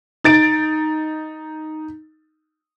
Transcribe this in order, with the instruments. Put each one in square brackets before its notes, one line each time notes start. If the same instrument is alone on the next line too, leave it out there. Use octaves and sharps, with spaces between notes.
[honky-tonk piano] D#4 A6 D7